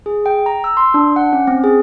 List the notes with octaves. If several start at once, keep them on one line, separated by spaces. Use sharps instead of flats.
G#4
G5
A#5
E6
C6
D4
F#5
C#4
C4
G#4